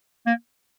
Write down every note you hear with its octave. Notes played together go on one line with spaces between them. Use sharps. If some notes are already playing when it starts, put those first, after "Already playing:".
A#3